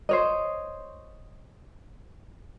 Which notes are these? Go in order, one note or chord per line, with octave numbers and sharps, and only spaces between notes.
C5 C#5 D#5